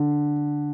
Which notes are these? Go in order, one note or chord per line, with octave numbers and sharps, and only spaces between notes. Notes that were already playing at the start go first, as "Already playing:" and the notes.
Already playing: D3